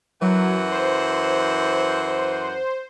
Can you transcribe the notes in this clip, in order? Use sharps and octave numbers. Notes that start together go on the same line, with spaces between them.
F#2 E3 F#3 F#5
C5